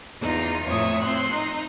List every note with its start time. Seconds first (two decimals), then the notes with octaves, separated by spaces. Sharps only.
0.21 E2 D#4 F4
0.67 F2 A2 C#5 E5 D#6
1.03 C4 C6 F#6
1.32 D#4